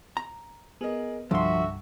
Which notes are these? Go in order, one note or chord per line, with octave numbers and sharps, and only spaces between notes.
A#5
B3 G#4 A#4 D#5
C2 G2 D3 F3 F#4 E5 C6